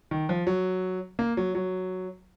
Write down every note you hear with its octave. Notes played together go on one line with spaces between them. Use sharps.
D#3
F3
F#3
A#3
F#3
F#3